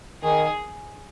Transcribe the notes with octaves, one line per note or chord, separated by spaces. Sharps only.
D#3 G#4